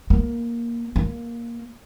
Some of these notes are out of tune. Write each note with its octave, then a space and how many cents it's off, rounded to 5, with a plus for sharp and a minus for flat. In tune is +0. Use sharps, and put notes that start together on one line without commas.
A#3 +10
A#3 +10